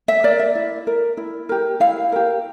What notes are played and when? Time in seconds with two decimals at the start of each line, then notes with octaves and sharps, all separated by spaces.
0.08 E5
0.23 A#4 D5
0.39 E5
0.55 E4
0.87 A#4
1.17 E4
1.49 G4 A#4
1.80 E4 F5
2.12 G4 A#4